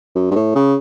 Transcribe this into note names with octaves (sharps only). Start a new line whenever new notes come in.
F#2
G2
A2
C#3